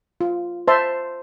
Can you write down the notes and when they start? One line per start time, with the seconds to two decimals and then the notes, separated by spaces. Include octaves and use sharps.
0.21 F4
0.68 C5 E5 A5 C6